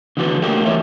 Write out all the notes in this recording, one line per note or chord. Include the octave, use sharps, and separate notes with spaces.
D3 E3 B3 F#4 G4 A4
A3 A#3 D#4 F#4 G4
E3 A#4 C#5 E5